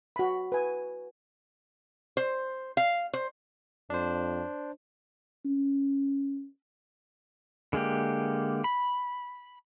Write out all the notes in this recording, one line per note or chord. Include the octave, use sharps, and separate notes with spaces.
F#4 B5
B4 G#5
C5
F5
C5
F2 D4 C5
C#4
D3 G#3 A#3 G4
B5